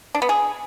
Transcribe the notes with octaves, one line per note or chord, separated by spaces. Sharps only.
D4
B3
G#4